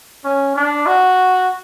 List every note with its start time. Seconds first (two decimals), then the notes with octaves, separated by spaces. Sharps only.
0.24 C#4
0.56 D4
0.86 F#4